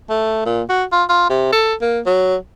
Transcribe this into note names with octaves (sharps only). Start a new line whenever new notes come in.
A3
A#2
F#4
F4
F4
C3
A4
A#3
F#3